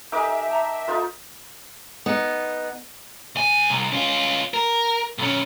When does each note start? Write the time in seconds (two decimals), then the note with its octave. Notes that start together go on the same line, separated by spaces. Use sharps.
0.12 D#4 G4 A4 A#4 E5 G#5 D6
0.49 G5 A5 A#5
0.88 D#4 F4 A4 A#4 C5
2.06 B3 D#4
3.36 C#2 G#5
3.70 C2
3.92 C#4 F4
4.54 A#4
5.18 B1 C#4